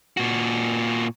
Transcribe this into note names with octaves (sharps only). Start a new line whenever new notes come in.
A#2 F#4